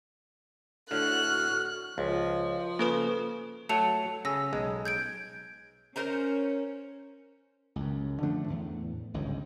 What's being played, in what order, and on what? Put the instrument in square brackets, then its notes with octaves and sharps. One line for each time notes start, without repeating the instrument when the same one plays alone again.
[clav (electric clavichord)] A2 D3 [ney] F#4 [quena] F6 [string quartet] F#6
[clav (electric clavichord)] C#2 [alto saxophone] F3
[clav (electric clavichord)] C#3 [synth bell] A#3 A4 B4
[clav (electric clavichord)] F#3 A3 [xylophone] A5 C#7 F7
[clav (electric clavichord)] C#3 [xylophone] G#5 E6 A#6
[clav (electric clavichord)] B1 G#3
[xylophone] G6 G#6 D7
[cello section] C#4 [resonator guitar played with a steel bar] A#4 C5 A#5
[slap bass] C#2 F#2
D3 F3 A3 D4
E2 A2
G1 C#2 G#2